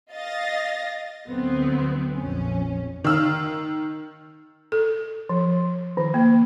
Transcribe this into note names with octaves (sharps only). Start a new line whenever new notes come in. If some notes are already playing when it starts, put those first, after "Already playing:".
D#5 F5 A6 A#6
D2 F#3 B3 C4
A#1 F2 C#4
D#3 E6 F6
A4
F3
D#3
A#3